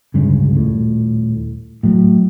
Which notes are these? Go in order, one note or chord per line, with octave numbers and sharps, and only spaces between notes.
D1 C#2 G2 C#3
D#1 A2
A2 F#3